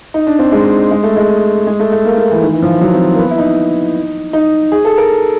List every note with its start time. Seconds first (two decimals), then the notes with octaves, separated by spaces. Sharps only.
0.14 D#4
0.27 D4
0.39 C4
0.52 G#3
0.91 G#3
1.03 A3
1.16 G#3
1.67 G#3
1.80 A3
1.92 A3
2.05 A#3
2.18 A#3
2.31 E3
2.43 D#3
2.53 E3
2.63 F3
2.81 F#3
2.95 C4
3.14 A#3
3.19 B3
3.31 E4
3.38 D#4
4.33 D#4
4.72 G#4
4.85 A4
4.98 A#4